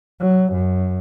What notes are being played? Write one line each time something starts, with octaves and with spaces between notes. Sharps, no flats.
F#3
F#2